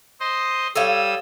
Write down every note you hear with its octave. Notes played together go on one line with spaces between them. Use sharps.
C5 D#5 C6
G3 A4 C#5 F5 D#6 E6